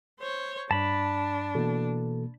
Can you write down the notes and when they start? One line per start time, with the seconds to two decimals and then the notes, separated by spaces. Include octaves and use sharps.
0.20 C5 C#5
0.71 G2 D4 A5 B5
1.55 B2 E3 A#3 A4